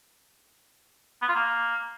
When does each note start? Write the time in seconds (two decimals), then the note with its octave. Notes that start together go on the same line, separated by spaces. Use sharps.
1.22 B3
1.28 F4
1.35 A#3